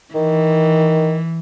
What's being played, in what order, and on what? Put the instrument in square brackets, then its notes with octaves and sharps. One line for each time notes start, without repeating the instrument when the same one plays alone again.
[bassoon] D#3 [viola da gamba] E3